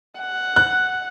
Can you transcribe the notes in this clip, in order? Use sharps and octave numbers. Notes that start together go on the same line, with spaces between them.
F#5
F#6